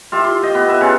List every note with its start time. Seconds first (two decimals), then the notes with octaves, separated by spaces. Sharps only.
0.12 F4 G4 E5
0.24 C6
0.43 D#5 G5
0.55 B3
0.68 B4 E5
0.81 C#3 F4